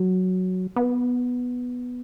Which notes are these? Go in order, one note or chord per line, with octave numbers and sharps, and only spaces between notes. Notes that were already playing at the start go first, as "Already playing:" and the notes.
Already playing: F#3
B3